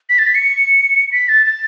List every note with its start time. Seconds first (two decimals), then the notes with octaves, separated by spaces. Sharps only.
0.09 B6
0.19 A6
0.27 B6
0.35 C#7
1.12 B6
1.29 A6
1.46 A6